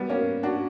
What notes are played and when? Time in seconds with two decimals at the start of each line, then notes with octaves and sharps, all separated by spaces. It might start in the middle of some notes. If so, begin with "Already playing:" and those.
Already playing: G3 B3
0.09 A#3 C#4
0.43 D4 F#4